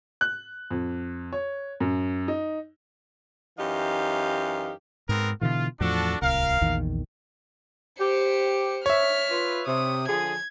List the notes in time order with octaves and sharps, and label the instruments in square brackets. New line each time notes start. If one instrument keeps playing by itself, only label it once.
[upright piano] F#6
F2
C#5
F#2
D#4
[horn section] F#2 E3 D#4 G4 F5
[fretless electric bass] G#2 [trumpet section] B3 C4 A#4
[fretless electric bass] B2 D3 E3 [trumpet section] F4
[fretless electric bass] E2 A2 F3 [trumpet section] D4 F#4 A4
[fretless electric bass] D1 C2 [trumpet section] A#4 F5
[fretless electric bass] A#1 E2 D#3
[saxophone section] G4 [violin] C5 C#7
[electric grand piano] C#5 E5 [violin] F6 B6
[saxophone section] F4 B4
[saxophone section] C3 [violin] D#6
[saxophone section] D3 F3 G#4 [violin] G#6